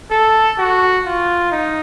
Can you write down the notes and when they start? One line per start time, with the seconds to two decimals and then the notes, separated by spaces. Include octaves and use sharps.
0.11 A4
0.58 F#4
1.05 F4
1.52 D#4